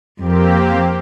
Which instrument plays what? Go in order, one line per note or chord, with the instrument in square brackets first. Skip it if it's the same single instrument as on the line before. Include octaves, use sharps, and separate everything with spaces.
[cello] F2 [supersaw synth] A#3 C4 G4